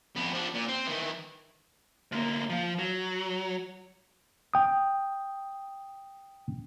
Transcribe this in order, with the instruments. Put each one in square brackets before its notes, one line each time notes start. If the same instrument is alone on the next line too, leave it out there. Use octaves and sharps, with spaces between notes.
[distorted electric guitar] F2 B3
F3 D4
A#2
C4
D#3 E3
[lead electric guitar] D2 A#3
F3 F4
F#3
[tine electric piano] G5 D#6